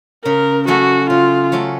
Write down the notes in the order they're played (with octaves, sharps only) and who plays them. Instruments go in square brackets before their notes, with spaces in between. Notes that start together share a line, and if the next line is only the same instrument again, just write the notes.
[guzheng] C#3 [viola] A#4
[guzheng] F#3 A3 C#4 A4 [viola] F#4
[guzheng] C#3 [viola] F4
[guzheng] F#3 A3 C#4 A4